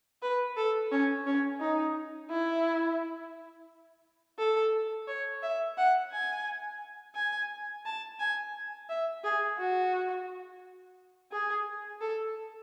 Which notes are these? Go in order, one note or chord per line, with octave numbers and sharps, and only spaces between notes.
B4
A4
C#4
C#4
D#4
E4
A4
C#5
E5
F#5
G#5
G#5
A5
G#5
E5
G#4
F#4
G#4
A4